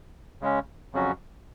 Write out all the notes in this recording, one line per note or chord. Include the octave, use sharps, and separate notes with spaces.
C#3 G#3 C#4
F2 C#3 F#3 C#4 F#4